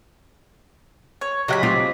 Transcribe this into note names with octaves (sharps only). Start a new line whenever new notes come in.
C#5
C#3 F#3 G4 D#5 F#5 B5
C4 F4 G4